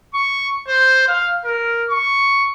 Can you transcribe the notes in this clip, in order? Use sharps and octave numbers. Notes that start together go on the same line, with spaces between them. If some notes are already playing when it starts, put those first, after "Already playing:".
C#6
C5
F5
A#4
C#6